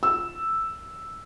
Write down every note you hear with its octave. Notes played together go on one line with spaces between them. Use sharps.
E6